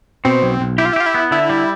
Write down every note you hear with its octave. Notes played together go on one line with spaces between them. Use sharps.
B2 C4
B1
B1
E4 G4
F4
E4
F4 G4
E4
B3
D3 E4
G3